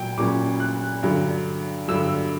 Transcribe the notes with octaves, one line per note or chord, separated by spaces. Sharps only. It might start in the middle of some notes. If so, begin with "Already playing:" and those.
Already playing: A#2 F#3 G5
A#2 F#3 C#4 D6
F#6
G2 D3 F#3
G2 D3 F#3 E6